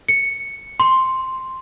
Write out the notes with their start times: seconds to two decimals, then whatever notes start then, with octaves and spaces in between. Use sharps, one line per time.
0.09 C#7
0.80 C6